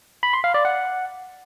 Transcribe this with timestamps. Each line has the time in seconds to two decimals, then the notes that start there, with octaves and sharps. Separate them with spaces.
0.23 B5
0.33 C6
0.44 F5
0.54 D5
0.65 F#5